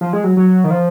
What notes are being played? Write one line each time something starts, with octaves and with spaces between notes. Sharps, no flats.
F3
G#3
F#3
F#3
D#3
F3